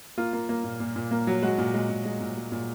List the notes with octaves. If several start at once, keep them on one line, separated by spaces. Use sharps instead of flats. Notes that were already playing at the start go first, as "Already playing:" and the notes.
A#3 F4
A#3
A#3
A#2
A#2
A#2
A#3
F#3
G#3 F#4
A#2
G#3
A#2
G#3
A#2
G#3
A#2